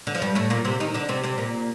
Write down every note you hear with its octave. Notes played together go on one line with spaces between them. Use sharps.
D3
F3
G2 G3
A2 A3
A#2 A#3
C3 C4
D#3 D#4
D3 D4
C3 C4
C3 C4
A#2 A#3